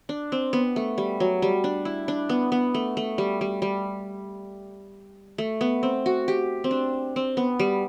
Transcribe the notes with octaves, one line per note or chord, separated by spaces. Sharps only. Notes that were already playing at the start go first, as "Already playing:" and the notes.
D4
C4
B3
A3
G3
F#3
G3
D4
E4
D4
B3
B3
A3
A3
G3
G3
G3
A3
B3
C4
F#4
G4
C4
D4
C4
B3
G3